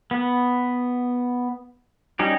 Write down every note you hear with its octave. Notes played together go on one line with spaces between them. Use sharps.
B3
G3 C#4 D#4 G4